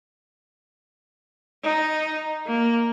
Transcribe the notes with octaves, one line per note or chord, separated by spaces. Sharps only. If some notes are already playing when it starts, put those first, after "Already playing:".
D#4
A#3